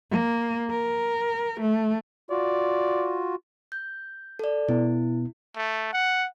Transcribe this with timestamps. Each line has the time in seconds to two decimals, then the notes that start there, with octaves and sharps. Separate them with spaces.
0.11 A#3
0.71 A#4
1.61 A3
2.31 F4 F#4 D5
3.72 G6
4.39 A4 D5
4.69 B2 B3 E4
5.56 A3
5.93 F#5